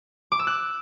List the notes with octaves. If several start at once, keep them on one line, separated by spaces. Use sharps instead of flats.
D6
E6
F#6